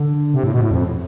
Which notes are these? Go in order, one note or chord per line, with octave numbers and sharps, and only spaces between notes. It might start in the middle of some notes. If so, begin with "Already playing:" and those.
Already playing: D3
C3
A2
B2
A2
F2